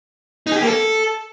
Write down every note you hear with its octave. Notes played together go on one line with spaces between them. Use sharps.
D#4
G#4
G4
A#3
A4